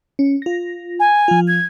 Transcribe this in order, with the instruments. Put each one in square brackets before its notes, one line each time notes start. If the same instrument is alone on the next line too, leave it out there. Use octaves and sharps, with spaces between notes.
[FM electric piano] C#4
F4 A#6
[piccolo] G#5
[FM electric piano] F3 F4
[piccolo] G#6